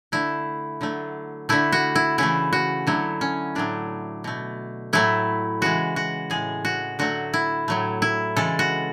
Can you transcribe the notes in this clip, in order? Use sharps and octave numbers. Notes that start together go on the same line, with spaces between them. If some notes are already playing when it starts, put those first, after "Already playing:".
D3 A3 E4
D3 F#3 A3
D3 A3 E4
F#4
E4
C#3 E3 A3 E4
F#4
D3 F#3 A3 E4
C#4
A2 F#3 A3 D4
B2 A3
A2 F#3 A3 E4
C#3 E3 G#3 F#4
F#4
A2 G#3 G#4
F#4
D3 F#3 A3 F#4
E4
A2 F#3 A3
E4
C#3 E3 G#3 A4
F#4